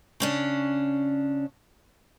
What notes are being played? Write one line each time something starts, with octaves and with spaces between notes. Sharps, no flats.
C#3 C#4 D4